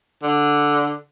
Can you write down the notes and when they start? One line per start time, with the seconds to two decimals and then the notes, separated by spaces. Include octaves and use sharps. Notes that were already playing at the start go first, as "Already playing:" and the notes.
0.23 D3